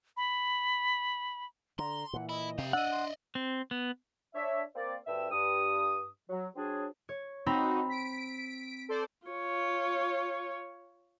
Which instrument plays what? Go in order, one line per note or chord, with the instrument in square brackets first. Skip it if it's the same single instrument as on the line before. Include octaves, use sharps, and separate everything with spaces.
[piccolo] B5
[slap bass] D3 [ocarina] A#5 [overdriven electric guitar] C6
[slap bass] A#2 E3 [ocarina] F#5
[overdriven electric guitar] E4 [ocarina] D#5
[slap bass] C3 [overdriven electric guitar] G4 F5
[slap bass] D4 [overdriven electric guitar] D5 D#5 [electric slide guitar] F#5 [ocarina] E6
[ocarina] C6
[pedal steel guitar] C4
B3
[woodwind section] D4 C#5 E5
A#3 C4 D5
D2 G2 E5 G5 E6
G2 D#6
F#3
F#3 C4 D4 G#4
[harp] C#5
[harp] C4 A#5 B5 [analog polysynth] D#4 F#4
[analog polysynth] B6 D7
A4 C5 D5
[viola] F4 C#5